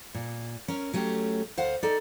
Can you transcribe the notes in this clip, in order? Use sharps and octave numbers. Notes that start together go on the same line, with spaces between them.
A#2
C#4 A#4
F#3 A3 C#4 G4
D2 C5 F5 F#5
D#4 A4 D5